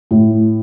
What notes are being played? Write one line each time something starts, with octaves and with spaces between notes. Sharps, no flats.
A2